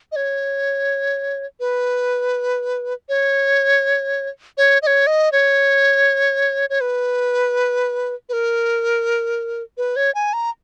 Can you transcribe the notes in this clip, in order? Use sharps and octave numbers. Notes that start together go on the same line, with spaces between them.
D#5
C#5
B4
C#5
C#5
D#5
C#5
D#5
C#5
C#5
B4
B4
A#4
B4
C#5
G#5
A#5